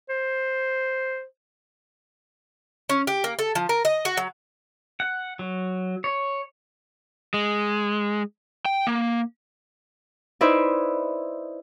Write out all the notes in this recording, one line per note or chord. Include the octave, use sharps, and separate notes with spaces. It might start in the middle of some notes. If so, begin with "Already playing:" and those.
C5
C#4
G4
A#3
A4
F3
A#4
D#5
F#4
F#3
F#5
F#3
C#5
G#3
G5
A#3
D#4 E4 B4 C5 D5 E5